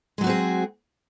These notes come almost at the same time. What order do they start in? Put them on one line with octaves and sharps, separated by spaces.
G#3 F#3 F#4 C4 G#4